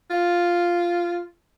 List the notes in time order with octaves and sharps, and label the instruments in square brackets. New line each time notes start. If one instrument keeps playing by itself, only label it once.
[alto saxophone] F4